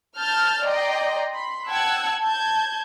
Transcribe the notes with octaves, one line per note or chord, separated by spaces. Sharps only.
A5 F6 G6 A6
D5 D#5 G5 A#5 C6
B5 C6
F#5 G5 A5 E6 F#6 G#6
A5 G6 G#6